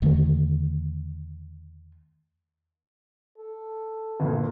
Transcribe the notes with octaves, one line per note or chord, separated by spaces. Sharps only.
E2 D3 D#3 A3
A4
G1 A#2